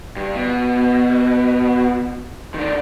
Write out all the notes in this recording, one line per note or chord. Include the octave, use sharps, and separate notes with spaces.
G2
B2
D#3 D4